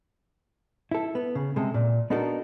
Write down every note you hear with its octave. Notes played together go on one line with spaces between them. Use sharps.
E4 A4
B3
C#3
C3 G#3 A4
A#2
B3 D4 D#4 F#4 A4 A#4